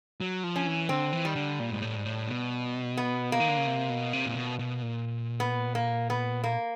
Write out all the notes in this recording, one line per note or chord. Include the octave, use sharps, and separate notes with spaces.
F#3
F3
C#4
E3
D3 C4
E3
D#3 G3
D3
A#2
G#2
A2
G#2
A2
B2
B3
A#3
D#3
D3
C#3
C3
B2
C3
A#2
B2
B2
A#2
B3
A#3
B3
A#3